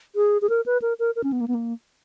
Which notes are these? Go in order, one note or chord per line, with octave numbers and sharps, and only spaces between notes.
G#4
G#4
A#4
B4
A#4
A#4
A#4
C#4
B3
A#3
B3
A#3